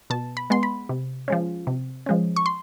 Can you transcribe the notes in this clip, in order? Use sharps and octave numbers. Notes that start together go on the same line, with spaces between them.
B2 A5
B5
G#3 B3 C6
B5
C3
F3 G#3 C#4
C3
F3 G#3 C#4
C#6
C6